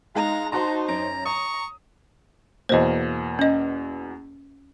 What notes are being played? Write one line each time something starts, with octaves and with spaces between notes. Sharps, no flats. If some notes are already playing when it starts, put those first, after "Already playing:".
G#3 D#4 F5 A#5
D#4 F#4 C5 A5 A#5 C6
F#2 A#5 D7
A#5 C#6 D#6
E2 B2 A#3 C5 D#5
C#4 D#5